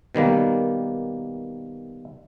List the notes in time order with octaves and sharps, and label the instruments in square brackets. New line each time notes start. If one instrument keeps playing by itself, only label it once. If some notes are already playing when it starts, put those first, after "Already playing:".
[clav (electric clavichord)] B2 D#3 G3 A#3